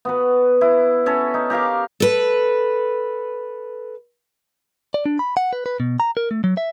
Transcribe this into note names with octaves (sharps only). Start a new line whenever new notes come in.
B3 F#4 B4
E4
C#4 A4 C#5
D#4
G4 A#4 F5 D6
A4 B4
D5
D4
B5
F#5
B4
B4
B2
A#5
A#4
A3
F#3
E5